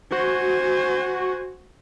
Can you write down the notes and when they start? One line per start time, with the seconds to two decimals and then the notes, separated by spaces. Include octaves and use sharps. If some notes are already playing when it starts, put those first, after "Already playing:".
0.12 F#4 C5 G#5